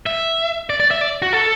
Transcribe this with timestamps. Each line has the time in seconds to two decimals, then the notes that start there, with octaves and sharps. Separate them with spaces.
0.06 E5
0.70 D5
0.80 D5
0.91 E5
1.01 D5
1.22 F#4
1.33 A4